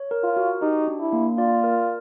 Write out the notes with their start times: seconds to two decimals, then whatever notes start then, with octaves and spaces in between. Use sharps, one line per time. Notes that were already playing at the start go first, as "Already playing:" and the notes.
Already playing: C#5
0.11 A#4
0.23 F4
0.37 F#4
0.62 D#4 G4
0.88 D4
1.00 E4
1.13 A#3
1.38 F4 D5
1.64 A#4